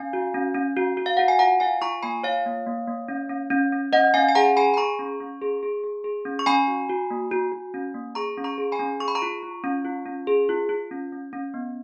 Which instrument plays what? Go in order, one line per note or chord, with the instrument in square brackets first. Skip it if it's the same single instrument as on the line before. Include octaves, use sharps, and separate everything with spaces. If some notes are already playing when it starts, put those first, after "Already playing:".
Already playing: [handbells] C#4 F5 G#5
F#4
C#4
C#4
F#4
F#4
F5
F#4 F#5
G#5
F4 F#5 A#5
F4 F5 G#5
F4 A#5 C#6
A#3 G#5 B5
F4 C#5 F5
A#3
A#3
A#3
C#4
C#4
C#4
C#4
C#4 D#5 F#5
C#4 F5 G#5
G#5
G#4 F#5 A#5
G#4 G#5 B5
B5
G#4 A#5 C#6
C#4
C#4
G#4
G#4
G#4
G#4
C#4
C#6
C#4 G#5 B5
F#4
F#4
A#3
F#4
F#4
C#4
A#3
G#4 A#5 C#6
C#4
A#5 C#6
G#4
G#5 B5
C#4
G#4 C#6
B5
A#5 C#6
F4
F4
C#4
F4
C#4
G#4
F4
F4
C#4
C#4
C#4
B3